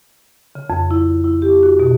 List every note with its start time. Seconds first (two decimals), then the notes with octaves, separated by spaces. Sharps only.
0.55 C#3
0.70 F2
0.91 E4
1.24 E4
1.42 G4
1.63 F#4
1.80 B2